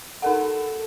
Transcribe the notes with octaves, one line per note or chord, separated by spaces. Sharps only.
D#4 A4 A#4 F#5